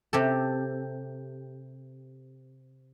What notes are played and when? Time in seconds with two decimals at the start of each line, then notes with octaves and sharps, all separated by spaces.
0.13 C3 G4 A4